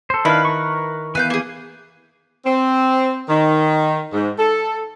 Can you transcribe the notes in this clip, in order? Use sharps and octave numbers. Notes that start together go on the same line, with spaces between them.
A4 C5
D#3 D4 E4 B4 F5
A#4 C#6
E3 B3 B4 F5 G6
A#3 G#4
C4
D#3
G#2
A4